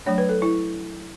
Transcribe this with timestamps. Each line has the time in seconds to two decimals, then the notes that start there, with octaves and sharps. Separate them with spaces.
0.06 F#3 A3 D4 C#5
0.18 B4
0.29 A4
0.42 E4